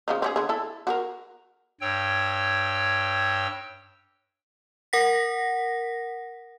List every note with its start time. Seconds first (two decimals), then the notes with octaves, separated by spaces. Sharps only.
0.08 C#3 F3 D#4
0.22 C4 C#4 G#4
0.36 D3 G#4
0.49 E4 A4
0.87 F#4 G#4 A#4
1.81 G2 C#5 G5 E6
4.93 A#4 F#5 A#6 B6